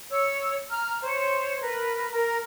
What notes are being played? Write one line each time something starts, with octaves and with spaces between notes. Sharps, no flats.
C#5 E6
A#5 F6
C5 C#5
A#4 B4
A#4